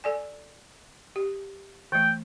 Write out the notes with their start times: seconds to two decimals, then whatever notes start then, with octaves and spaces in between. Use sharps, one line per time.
0.04 A4 D5 G#5
1.16 G4
1.92 E3 A3 G5